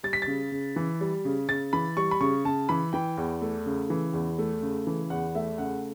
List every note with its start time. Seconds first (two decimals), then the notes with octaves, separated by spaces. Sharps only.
0.03 G3 A6
0.13 B6
0.22 A6
0.27 C#3
0.52 C#3
0.76 E3
1.01 G3
1.25 C#3
1.49 C#3 A6
1.73 E3 B5
1.97 G3 C#6
2.11 B5
2.21 C#3 C#6
2.45 C#3 A5
2.69 E3 B5
2.93 E3 G5
3.17 E2
3.41 A3
3.66 C#3
3.90 E3
4.13 E2
4.39 A3
4.62 C#3
4.87 E3
5.10 E2 F#5
5.35 A3 E5
5.58 C#3 F#5